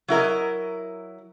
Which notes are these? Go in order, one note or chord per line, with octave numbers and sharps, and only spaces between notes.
F#3 E4 A#4 D#5